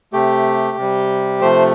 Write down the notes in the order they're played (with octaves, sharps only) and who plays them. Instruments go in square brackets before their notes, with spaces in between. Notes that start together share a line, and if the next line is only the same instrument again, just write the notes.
[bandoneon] C3 A3 G4
C3 G3
C3 F3 A3 C5